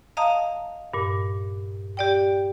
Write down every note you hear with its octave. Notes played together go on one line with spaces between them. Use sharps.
D#5 F5 A5 A#5 D#6
G2 A#2
G4 D5 G5